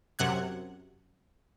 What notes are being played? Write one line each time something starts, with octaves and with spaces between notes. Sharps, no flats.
F#2 C3 F#5 F#6 G#6